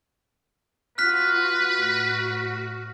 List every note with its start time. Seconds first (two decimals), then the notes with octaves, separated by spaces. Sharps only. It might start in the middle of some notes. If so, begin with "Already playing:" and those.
0.98 F4 F#4 B4 F6 F#6 B6
1.77 A2 F#4